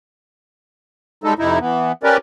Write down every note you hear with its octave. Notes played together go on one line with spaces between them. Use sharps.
G3 G#3 D#4 A4
F2 C3 D#4 E4
E3 B3
C#4 G4 A#4 B4 D5